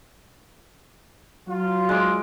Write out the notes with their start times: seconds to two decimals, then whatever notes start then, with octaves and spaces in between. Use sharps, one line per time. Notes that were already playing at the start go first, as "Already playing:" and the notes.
1.48 F#3 F4
1.89 G#3 D6